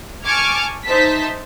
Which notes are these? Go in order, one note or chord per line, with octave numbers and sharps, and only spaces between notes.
G#5 A5 C#6 D6 F6 G#6
D#4 C5 E5 A5 B6